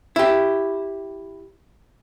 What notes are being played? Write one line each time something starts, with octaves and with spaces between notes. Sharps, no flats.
E4 G4